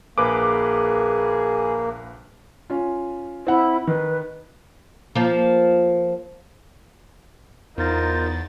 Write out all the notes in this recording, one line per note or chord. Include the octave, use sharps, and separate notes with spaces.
A#1 A#3 G#4 B4 D6
C#4 F4
C4 E4 F#5
D#3 B4
F3 A#3
E2 D#4 F4 A#4 C5 A6